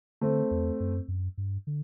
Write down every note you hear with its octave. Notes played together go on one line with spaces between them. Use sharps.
D3 A3 C4
E2
F#2
F#2
G2
D3